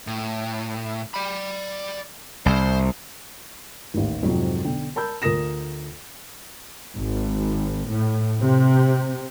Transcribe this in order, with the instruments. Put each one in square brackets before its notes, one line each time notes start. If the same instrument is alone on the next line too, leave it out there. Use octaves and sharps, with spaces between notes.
[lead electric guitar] A2
D5 B5
[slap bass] C2 [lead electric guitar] C5
[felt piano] A1 D#2
F2 G#2 C3 F#3 C4
B1 D3 G5
A#4 A5 B5 E6 G6
D2 F4 A#4 D#6 A#6 E7
[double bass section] G#1
A2
C3